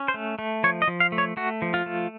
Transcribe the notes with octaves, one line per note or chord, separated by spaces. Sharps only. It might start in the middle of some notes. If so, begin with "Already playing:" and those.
Already playing: C#4
C5
A3
A3
F3 C#5
D#5
F3
F5
A3
C#5
A3 F#4
F3
F4
A3